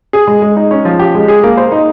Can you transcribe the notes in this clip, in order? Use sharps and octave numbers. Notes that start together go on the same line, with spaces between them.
G#4
G#3
G#3
D#4
C#4
F3
G4
G#3
G#4
A#3
C5
D#4